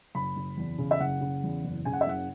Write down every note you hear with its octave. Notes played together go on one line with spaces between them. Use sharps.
F#1 B5
F#1
E2
C#3
E5
F#1 F#5
C#3
E2
F#1
C#3 G#5
F#5
E5
F#1 F#5